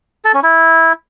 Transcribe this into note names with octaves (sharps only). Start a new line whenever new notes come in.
A4
C#4
E4